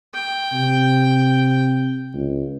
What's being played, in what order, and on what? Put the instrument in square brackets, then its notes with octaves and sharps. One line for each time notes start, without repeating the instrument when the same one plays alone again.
[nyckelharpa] G5
[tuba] C3
C#2